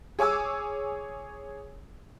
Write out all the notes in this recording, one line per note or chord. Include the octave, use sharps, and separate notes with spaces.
G#4 C#5 G#5 D6 E6